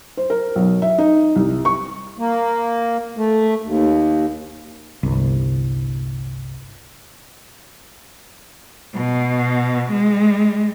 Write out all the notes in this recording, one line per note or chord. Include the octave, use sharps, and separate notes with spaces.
C5
A#4
B1
E5
D#4
C2
C#6
A#3
A3
D#2
G1 C2
B2
G#3